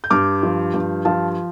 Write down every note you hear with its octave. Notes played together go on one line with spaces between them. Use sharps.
G6
G2 D6 F6
F3
G2
F3 F5 A5